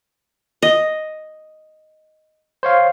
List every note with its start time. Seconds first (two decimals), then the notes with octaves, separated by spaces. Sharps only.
0.62 D#5
2.63 C5 C#5 F5